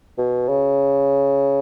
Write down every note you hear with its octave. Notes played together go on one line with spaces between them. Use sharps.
B2
C#3